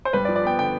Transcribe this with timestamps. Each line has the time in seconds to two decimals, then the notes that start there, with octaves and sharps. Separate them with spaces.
0.05 C5
0.13 G2 B4
0.25 D5
0.29 F3
0.36 D5
0.44 B3 G5
0.59 D3 G5